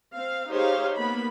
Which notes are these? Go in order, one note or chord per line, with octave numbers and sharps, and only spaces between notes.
C4 F5
D#4 G4 G#4 C5 C#5 F5
A#3 B3 B5